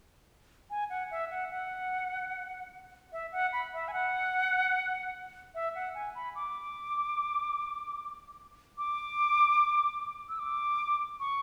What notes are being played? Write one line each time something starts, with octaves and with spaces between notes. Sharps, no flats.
G#5
F#5
E5
F#5
F#5
E5
F#5
B5
E5
G#5
F#5
E5
F#5
G#5
B5
D6
D6
E6
D6
C#6